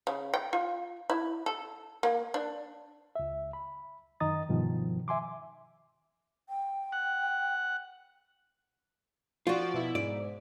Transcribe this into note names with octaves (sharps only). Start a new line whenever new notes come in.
C#3
G5
F4
E4
A4
A#3
D4
C#2 E5
B5
F#2 D#3 D#5 A#5 D#6 A6
G2 B2 D#3 F3
E5 G#5 C6 D6
G5
F#5
F3 F4 F#4 D5
B2 E4
G#2 D5